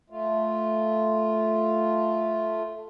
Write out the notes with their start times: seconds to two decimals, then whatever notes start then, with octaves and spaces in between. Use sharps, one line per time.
0.10 A3 F4